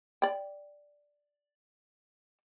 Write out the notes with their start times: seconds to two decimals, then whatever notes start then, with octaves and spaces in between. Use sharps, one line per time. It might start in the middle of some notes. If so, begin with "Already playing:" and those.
0.22 D5 G5